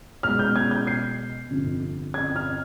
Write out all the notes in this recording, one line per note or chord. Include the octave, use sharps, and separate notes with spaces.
B1 B2 G#3 F6
G6
G#6
G6
C7
G1 F2 C3
G#6
F6